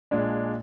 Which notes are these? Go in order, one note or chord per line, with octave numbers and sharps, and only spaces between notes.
A#1 A#2 G#3 D4